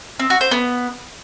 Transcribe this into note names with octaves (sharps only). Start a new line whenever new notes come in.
C4
F#4
C5
B3